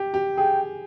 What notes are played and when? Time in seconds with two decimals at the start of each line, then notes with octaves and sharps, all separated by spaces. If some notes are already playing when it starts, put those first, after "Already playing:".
Already playing: G4
0.14 G4
0.37 G#4 G5